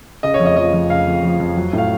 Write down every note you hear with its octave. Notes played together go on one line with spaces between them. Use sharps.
C#3 D#5
C#5
F2
D#5
F3 D#5
F2
C#3 F5
F2
F3
F2
F#3
A2 F5